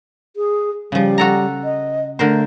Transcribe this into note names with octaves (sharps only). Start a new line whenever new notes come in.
G#4
C#3 F3 G3
F#4 A4 A#5
D#5
D3 A3 A#4 C5